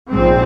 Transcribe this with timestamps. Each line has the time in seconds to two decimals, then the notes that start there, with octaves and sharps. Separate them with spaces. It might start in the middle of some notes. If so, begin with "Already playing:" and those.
0.11 A#1 G#2 C4